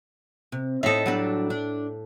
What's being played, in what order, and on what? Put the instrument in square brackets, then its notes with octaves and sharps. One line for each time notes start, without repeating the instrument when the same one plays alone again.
[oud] C3
[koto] A2 A4 [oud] D#4 E5
[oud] F#3 G3 D4
D4